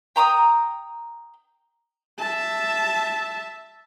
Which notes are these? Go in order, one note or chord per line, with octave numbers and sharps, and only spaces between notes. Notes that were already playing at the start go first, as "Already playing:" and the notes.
G5 A#5 D6 D#6
E5 A5